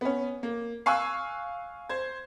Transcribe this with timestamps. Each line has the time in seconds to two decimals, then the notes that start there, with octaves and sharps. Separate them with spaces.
0.01 B3 C#4
0.43 A#3
0.86 F5 G#5 C#6 E6 F#6
1.89 C5 G#6